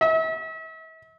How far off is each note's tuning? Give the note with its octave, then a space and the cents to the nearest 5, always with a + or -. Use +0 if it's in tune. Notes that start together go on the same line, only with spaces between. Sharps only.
E5 -40